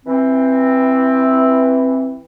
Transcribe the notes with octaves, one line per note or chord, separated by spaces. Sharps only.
E3 C4